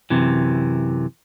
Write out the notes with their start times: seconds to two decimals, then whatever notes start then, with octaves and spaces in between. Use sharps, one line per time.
0.10 F#2 C3 E3